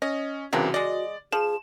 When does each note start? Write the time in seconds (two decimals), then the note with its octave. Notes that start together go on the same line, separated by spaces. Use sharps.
0.02 C#4 D#5
0.53 C2 C#3 E3 A#3 C4 D4 F#4
0.74 G#3 D5 D#5
1.32 F3 G#4 E7